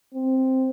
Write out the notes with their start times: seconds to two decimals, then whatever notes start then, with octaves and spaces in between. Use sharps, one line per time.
0.14 C4